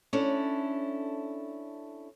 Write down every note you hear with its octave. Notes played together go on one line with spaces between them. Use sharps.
C#4 D4 E4 A4